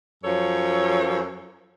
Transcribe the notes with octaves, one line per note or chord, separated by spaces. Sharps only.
F#2 F3 A4 C#5